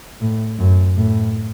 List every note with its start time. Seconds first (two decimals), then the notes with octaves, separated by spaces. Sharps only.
0.21 A2
0.59 F#2
0.97 A2